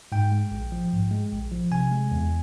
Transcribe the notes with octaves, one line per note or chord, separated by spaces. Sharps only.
G#2 G5
G#3
A#1
F3
G#2
G#3
A#1
F3
C3 G#5
G#3
E2